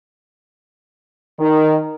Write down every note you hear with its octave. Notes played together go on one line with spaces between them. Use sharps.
D#3